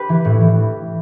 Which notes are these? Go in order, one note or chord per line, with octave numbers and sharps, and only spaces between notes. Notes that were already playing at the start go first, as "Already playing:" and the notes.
Already playing: G4 B4
E3
A2
E3